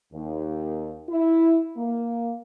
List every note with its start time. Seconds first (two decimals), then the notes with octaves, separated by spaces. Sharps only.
0.13 D#2
1.09 E4
1.77 A#3